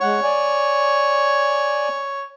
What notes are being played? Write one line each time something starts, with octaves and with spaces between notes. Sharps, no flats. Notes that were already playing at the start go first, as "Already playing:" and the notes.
G#3 C#5 F#5
D5 G#5